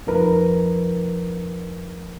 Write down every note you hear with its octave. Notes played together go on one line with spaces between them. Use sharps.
F2 F3 D#4 A#4 B4 A#5